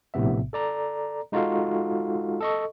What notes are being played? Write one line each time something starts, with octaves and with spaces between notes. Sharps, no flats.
A#1 A2 C3 B3 E5
A4 D5 A#5
G#3 D#4 F4 F#4 A4 F5
A4 D#5 C#6